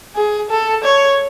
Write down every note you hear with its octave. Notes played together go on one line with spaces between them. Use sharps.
G#4
A4
C#5